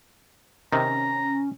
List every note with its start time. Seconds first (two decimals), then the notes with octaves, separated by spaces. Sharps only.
0.72 C3 D#3 C#4 A#5